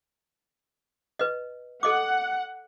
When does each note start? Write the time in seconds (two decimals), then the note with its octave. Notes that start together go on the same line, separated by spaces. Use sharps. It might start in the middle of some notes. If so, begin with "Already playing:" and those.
1.19 B4 D#5
1.83 A4 D#5 F#5 D6